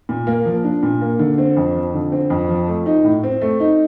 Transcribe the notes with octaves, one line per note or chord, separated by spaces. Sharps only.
A#2
A#3
F3
D4
A#2
A#3
D3
C4
F2
F3
D3
C4
F2
F3
A3
D#4
A2
C4
A3
D#4